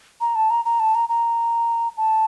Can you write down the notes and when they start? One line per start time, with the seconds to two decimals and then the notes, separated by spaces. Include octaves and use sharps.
0.21 A#5
0.35 A5
0.50 A#5
0.65 A#5
0.80 A5
0.95 A#5
1.09 A#5
1.97 A5